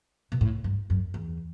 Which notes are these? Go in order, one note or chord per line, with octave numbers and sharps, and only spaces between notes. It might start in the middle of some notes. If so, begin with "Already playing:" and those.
B2
A2
G2
F#2
E2